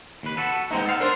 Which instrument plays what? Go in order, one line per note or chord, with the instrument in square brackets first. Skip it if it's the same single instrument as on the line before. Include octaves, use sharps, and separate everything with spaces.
[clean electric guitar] D#2 B4
[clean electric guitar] F#4 A4 B4 [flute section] F#5 A5
[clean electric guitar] G#3 A#3 [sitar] B3 D#4 [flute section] A#5
[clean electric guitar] A4 F5 [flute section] F#5
[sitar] D4 A#4 C5 [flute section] D5 C6